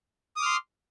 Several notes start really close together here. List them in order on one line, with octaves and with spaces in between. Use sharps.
D#6 D6 F6 C6